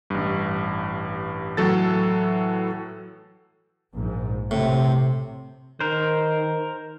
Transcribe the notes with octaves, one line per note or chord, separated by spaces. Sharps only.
A1 G2
A2 E3 F#3 A4 A6
A#1 G#2
A2 C3
D#3 A#4 C5